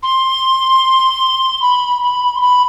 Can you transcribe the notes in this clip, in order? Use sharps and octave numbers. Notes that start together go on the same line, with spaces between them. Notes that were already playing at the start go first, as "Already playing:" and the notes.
C6
B5
B5
C6
B5